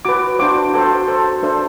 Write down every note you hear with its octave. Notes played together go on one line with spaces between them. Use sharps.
F#4 B4 D6
D4 F#4 C5 D6
F#4 A4 C5
F#4 A4 C5
D4 A4 C5